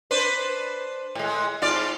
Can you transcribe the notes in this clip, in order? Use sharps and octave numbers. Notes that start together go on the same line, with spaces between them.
D4 B4 C5
A2 G#3
G#2 F4 D5